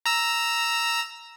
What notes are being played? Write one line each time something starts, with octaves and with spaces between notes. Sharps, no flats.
A#5 E6